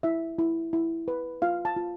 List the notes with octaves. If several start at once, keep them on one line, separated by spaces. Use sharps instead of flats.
E4 E5
E4
E4
B4
F4 F5
A5
F4